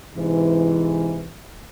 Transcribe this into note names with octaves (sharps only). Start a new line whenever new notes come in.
G#2 C3 E3